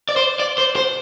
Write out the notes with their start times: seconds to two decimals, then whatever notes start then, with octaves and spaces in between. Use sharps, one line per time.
0.09 D5
0.16 C5
0.40 D5
0.58 C5
0.76 C5